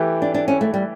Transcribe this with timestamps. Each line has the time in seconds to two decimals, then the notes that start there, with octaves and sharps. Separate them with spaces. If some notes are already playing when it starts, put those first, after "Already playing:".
Already playing: E3 A3 E4 G4 B4
0.22 D4
0.34 D4
0.48 C#4
0.61 A3
0.74 G3